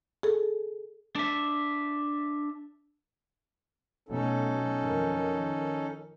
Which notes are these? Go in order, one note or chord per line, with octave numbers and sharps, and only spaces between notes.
G#4 A4
D4 E5
B2 F#3 A3 C#4 D#4 A4
F2 D#3